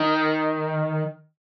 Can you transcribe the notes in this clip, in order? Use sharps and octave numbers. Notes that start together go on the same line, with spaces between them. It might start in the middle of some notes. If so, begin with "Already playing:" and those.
Already playing: D#3